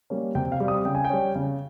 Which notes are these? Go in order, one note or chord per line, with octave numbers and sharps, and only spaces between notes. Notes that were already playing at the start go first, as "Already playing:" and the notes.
G3 A#3 C#4
C3 G5
F5
G3 C4
D#6
C#3 G5
G#5
G5
G3 C#4
C#3